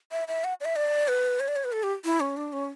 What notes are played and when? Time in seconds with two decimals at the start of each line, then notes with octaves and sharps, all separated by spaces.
0.12 E5
0.28 E5
0.44 F#5
0.60 D5
0.65 E5
0.76 D5
1.08 B4
1.40 C#5
1.48 D5
1.56 C#5
1.64 B4
1.72 A4
1.83 G4
2.05 E4
2.20 C#4
2.37 D4
2.53 C#4